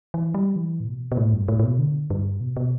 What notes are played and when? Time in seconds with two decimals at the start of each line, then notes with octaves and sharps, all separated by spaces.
0.14 E3
0.34 G3
0.56 E3
0.80 A2
0.86 B2
1.12 B2
1.17 A2
1.33 G2
1.48 A2
1.59 A2
1.64 B2
1.79 D3
2.10 G2
2.41 B2
2.57 B2